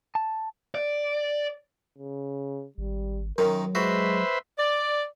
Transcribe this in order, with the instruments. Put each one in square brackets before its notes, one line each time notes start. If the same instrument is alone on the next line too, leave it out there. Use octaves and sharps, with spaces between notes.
[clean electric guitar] A5
[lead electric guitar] D5
[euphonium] C#3
[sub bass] G#1 [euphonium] G3
[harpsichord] F#2 D#3 [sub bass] F#3 [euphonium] A#4
[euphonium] G#3 [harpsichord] F#4 [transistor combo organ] B4 C5 E5
[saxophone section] D5